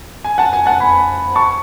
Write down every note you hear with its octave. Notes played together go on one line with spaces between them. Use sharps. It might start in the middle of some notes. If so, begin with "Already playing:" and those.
G#5
F#5 A5
G#5
F#5 A5
G#5 B5
A5 C#6